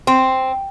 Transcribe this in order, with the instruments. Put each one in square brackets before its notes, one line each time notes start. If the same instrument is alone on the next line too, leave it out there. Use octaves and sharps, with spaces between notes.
[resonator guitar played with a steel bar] C4